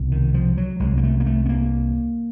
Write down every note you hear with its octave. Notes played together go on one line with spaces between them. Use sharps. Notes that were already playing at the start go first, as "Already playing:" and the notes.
Already playing: C2 B2
D#3
F3
F#3
C2 C3 G#3
A#3
A3
A#3
A3
B3
A#3